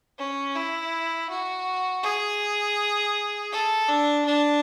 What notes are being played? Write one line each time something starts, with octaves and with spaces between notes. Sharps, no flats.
C#4
E4
F#4
G#4
A4
D4
D4